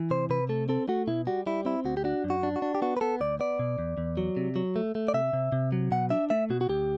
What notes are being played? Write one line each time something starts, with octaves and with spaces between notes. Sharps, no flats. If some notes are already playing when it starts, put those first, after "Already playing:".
Already playing: E3
C3 C5
C3 B4
A3 A4
C4 A4
A3 F#4
B2 E4
G3 F#4
G3 E4
C4 E4
D2 F#4
G4
D4 F#4
F#2
F#4
D4
F#4
D4
G4
B3 F#4
B4
B3 A4
D2 D5
B3 D5
B2
E2
E2
F#3
C3
F#3
A3
A3
D5
C3 E5
C3
C3
F#3
B2 F#5
D4 E5
A3 E5
B2 F#4
F#4
D2 G4